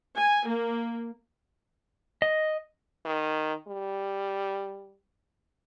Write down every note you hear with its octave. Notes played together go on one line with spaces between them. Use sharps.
G#5
A#3
D#5
D#3
G3